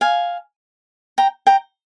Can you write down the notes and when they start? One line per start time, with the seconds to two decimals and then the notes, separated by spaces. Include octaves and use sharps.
0.01 F5 G#5
1.18 G5 A#5
1.47 G5 A#5